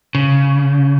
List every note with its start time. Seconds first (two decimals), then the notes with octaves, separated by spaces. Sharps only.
0.15 C#3